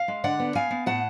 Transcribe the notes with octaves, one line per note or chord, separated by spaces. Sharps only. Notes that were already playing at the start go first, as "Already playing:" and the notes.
Already playing: F5
G#3
D3 D5 F#5
B3
B3 F5 G#5
B3
A2 F#5 A5